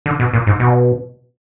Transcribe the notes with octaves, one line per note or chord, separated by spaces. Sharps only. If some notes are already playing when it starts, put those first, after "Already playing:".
D3
B2
A#2
G#2
B2